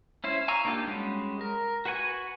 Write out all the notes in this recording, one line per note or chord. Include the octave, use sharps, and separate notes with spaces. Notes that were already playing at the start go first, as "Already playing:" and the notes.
C#4 E4 C5
F5 G#5 A#5 C#6 E6
A#3 D4 D#4 F4 G4
G3 G#3 C#4 F#4
A#4
F#4 B4 F#5 G#5 C#6